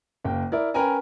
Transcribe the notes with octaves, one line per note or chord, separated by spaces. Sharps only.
F#1 A#3 G5
E4 A#4 D5
C#4 A#4 B4 G5 G#5 A#5